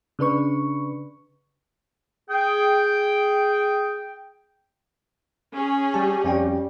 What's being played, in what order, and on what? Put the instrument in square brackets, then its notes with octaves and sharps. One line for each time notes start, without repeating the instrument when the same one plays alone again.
[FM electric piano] C#3 D4 B4 C#6
[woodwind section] G#4 G5
[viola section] C#4 G#4
[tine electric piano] G3 A5 [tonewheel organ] G4
[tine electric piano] F2 C#4 G5 [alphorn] G3